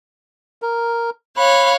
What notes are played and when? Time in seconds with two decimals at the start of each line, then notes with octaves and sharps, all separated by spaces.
0.62 A#4
1.37 C#5 F5 B5 F#6